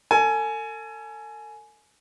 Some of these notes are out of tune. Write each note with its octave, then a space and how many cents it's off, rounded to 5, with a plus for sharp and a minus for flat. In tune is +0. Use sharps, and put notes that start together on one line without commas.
A4 +40 G#5 +20